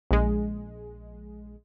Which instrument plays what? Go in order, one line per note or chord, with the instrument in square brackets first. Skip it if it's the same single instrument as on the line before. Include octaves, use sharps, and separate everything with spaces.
[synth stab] A#1 G#3